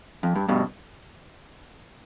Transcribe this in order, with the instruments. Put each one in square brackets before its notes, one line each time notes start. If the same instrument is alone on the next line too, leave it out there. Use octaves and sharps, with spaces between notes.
[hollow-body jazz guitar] F2
G2
G2 B2